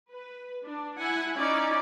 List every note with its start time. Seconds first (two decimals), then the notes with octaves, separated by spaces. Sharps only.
0.11 B4
0.65 D4
1.00 E4 F#5 G#5
1.37 C#4 D#4 E4 D5